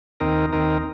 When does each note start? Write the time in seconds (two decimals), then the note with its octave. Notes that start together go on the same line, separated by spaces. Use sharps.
0.20 D#2 D#3 C4 D#4 A#4
0.53 D#2 D#3 C4 D#4 A#4